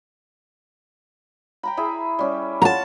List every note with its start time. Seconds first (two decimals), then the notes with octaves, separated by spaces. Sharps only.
1.63 G5 A#5 B5
1.77 E4 G#4 E5
2.19 G3 C#4 G4
2.62 C#4 F4 F#5 A5 A#5